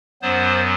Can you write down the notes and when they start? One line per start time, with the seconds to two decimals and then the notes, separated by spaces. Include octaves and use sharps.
0.22 F#2 F#3 B3 C5